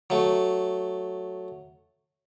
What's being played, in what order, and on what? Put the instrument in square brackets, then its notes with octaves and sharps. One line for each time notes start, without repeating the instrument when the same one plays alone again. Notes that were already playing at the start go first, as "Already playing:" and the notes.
[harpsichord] F#3 A3